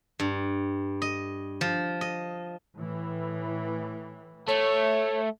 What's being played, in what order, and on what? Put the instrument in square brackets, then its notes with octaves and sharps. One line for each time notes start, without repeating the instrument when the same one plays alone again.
[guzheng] G2
D#5
F3
D#5
[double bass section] A2 E3
[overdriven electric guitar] A3 [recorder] C#5